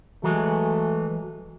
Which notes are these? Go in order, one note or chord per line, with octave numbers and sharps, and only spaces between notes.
E3 F#3 G#3 A3